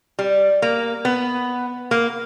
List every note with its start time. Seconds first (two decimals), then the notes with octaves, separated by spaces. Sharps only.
0.19 G3
0.62 A#3
1.05 B3
1.91 A#3